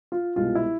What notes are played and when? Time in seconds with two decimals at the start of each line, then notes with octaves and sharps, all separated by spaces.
0.12 F4
0.36 C2 B2 G#3 B3 F4
0.55 E4